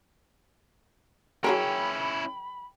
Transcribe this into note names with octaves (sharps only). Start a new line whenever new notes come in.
F#3 C#4 E4 G#4 A#4 G5 B5